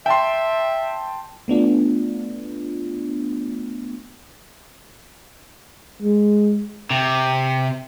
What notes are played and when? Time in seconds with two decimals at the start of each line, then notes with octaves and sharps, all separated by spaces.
0.06 E5 G5 A5 C6
1.48 A3 B3 D4 F4
6.02 G#3
6.90 C3